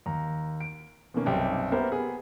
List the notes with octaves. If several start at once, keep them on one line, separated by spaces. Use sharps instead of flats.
D#2 A#5
D7
B2 D#3 A#3 C#4
B1 F#2 C3 G3 G5
A#3 B3 G4 A#4 C5 E5
B3 G#4